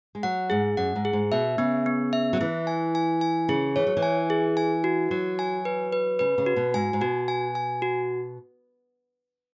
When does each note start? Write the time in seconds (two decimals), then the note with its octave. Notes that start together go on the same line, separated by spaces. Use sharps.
0.15 G#3
0.23 F#3 F#5
0.50 G#2 G#4
0.77 F#2 F#5
0.96 G#2
1.05 G#4
1.13 G#2
1.32 B2 E5
1.58 C#3 B3
1.86 B3
2.13 E5
2.33 F#3
2.41 E3 E4
2.67 G#5
2.95 G#5
3.21 G#5
3.49 C#3 G#4
3.76 E3 C#5
3.87 F#3
3.97 E3
4.03 G#5
4.30 G#4
4.57 G#5
4.84 F#4
5.11 F#3 F#4
5.39 G#5
5.65 B4
5.93 B4
6.19 C#3 B4
6.38 C#3
6.46 F#4
6.56 B2
6.74 G#2 G#5
6.93 G#2
7.01 B2 F#4
7.28 G#5
7.55 G#5
7.82 F#4